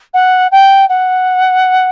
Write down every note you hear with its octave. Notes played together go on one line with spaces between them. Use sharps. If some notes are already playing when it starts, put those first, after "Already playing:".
F#5
G5
F#5